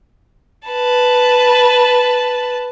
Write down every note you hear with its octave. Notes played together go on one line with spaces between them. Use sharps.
B4 A5